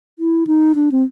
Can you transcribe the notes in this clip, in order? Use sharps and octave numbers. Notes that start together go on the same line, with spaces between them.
E4
D#4
D4
C4